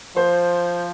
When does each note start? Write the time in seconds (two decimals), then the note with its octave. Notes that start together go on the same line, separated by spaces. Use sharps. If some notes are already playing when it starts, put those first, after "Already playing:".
0.16 F3 C5